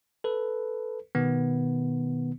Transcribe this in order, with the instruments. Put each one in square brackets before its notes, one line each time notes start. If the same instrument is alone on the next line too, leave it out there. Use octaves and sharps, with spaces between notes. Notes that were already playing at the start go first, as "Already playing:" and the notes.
[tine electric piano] A4 B4
B2 D#3 B3